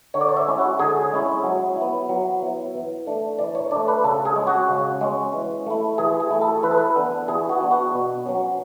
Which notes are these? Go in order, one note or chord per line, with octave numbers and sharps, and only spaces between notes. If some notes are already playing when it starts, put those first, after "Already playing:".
D3 C#5
D5
C#5
E5
G#3 C#4 E4
F#4
D3 G#4
G#3 C#4 E4
F#3
E4
B3
F#3
B3 E4
E3
A3 D4
E3 D5
C#5
A3 D4 D5
B4
C#3 A4
G#4
G#3 C#4
F#4
C#3
G#3 C#4
E3
A3 E4
E3 G#4
G#4
A3 E4
A4
E3 B4
A4
B4
B3 D4
E3 G#4
F#4
B3 D4
F#4
B2
F#3 C#4